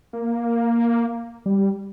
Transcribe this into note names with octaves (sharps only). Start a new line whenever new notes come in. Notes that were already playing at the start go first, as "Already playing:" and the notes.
A#3
G3